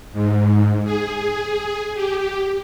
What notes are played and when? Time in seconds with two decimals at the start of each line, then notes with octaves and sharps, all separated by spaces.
0.12 G#2
0.84 G#4
1.94 G4